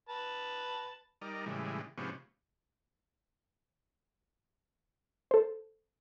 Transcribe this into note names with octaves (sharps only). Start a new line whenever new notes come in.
B4 A5
G3 D#4 A#4 D5
A2 C#3 E3 G3 G#3
G#2 C3 F3 B3 C#4 G4
A4 C5